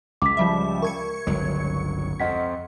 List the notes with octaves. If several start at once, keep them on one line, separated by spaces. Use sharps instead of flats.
C#2 D6 B6
F3 G3 E5
A#4 C#6 G#6 C#7
G1 C#2 F#3
F2 D#5 F#5 B6